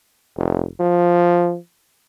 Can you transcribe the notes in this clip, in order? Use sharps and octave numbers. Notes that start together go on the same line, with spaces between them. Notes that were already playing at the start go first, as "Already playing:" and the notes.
F1
F3